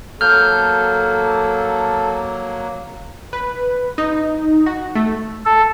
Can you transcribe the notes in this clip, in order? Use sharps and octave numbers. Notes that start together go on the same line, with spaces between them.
F#3 A#3 A4 F6 G6
B4
D#4
F#4
A3
A4